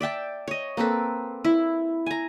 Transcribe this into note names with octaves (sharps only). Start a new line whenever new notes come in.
D5 E5 G5 A5
C#5 D#5
A#3 C4 A4 B4
E4
G#5 A#5